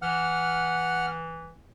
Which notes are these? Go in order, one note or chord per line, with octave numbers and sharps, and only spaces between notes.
E3 F#5 F6